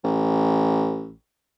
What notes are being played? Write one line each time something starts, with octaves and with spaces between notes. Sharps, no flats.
A1